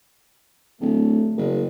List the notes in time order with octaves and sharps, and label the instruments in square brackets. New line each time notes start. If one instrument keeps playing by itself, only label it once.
[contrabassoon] D1 [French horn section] A3
[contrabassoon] F#1